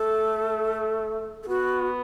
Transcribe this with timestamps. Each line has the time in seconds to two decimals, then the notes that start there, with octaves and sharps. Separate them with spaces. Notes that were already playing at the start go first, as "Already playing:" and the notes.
Already playing: A3 A4
1.43 A4
1.48 B3 F#4